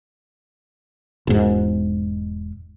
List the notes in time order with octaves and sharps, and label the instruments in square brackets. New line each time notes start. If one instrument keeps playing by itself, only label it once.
[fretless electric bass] E1 G#2